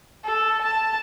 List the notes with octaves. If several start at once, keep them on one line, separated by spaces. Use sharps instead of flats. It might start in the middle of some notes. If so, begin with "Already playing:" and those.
A4
A5